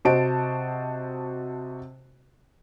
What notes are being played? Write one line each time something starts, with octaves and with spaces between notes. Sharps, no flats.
C3 F#4 C5 D#5 A5 D7